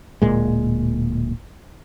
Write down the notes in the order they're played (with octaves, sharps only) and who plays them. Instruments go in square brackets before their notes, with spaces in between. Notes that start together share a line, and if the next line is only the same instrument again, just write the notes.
[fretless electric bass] D1 A#2 G#3